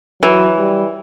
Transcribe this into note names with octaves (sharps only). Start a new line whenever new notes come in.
E3 F#3
G3